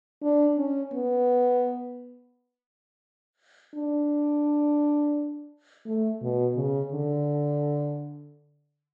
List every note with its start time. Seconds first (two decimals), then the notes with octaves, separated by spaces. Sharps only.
0.23 D4
0.58 C#4
0.93 B3
3.75 D4
5.86 A3
6.22 B2
6.56 C#3
6.92 D3